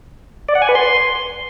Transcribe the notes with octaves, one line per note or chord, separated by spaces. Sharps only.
D5
F#5
G#5
B4
C6